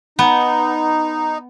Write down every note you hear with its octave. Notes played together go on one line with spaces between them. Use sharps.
B3 D#4